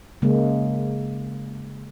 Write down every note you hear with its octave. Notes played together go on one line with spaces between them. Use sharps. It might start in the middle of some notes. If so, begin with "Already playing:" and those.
C#3 G#3 A#3